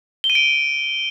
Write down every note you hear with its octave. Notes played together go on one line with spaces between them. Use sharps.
G7
D#7
D7